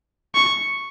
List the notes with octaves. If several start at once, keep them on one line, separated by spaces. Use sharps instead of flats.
C#6